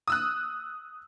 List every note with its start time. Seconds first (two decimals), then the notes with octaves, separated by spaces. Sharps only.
0.08 D#6 E6 F#6